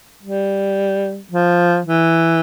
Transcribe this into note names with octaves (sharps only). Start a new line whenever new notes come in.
G3
F3
E3